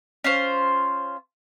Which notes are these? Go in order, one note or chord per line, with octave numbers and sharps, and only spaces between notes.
C#4 F4 C5